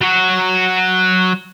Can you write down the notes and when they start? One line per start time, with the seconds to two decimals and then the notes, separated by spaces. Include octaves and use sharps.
0.01 F#3 F#4